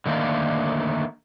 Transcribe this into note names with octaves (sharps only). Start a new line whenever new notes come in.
D3 D#3 A3 A#3